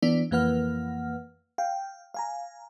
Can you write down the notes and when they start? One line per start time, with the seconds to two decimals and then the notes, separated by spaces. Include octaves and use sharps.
0.02 E3 B3 D4 D5
0.31 F2 E3 A#3 B4 F#5 F6
1.58 F5 G5
2.14 F5 G#5 A#5